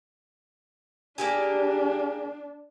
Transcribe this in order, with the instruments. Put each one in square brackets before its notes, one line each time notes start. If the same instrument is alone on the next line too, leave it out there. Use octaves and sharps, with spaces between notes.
[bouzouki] A#3 G4 G#4 [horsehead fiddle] D4